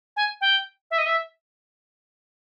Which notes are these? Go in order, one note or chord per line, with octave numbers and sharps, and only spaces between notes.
G#5
G5
E5
D#5
E5